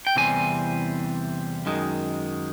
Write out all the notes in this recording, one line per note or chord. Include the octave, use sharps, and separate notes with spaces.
G5
E2 C3 E3 G3 C4 G#5
F#2 D#3 G#3